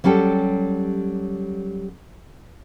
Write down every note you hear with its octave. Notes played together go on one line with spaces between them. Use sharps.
F#3 G3 C#4 G4 A4